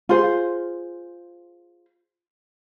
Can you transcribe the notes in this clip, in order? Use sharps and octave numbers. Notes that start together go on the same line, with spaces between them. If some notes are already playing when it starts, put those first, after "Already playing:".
F4 G#4 C5